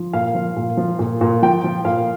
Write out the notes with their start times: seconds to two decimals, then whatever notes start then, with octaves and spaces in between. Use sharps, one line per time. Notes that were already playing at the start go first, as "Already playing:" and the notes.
Already playing: F3
0.13 A#2 F5
0.35 F3
0.56 A#2
0.77 F3
0.99 A#2
1.21 A#2
1.42 F3 G5
1.64 F3
1.85 A#2 F5